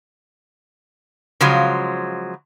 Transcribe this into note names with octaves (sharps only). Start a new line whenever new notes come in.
C#3 F3 F#3 G#3